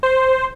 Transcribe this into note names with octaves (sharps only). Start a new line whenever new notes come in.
C5